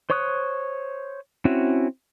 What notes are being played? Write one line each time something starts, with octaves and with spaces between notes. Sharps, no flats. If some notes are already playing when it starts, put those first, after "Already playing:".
C5 C#5 C#6 D#6 F#6
C4 C#4 E4 F#4